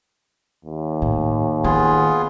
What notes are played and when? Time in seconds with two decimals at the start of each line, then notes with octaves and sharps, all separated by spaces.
0.65 D#2
1.02 A2
1.64 D#3 B3 F4 G#4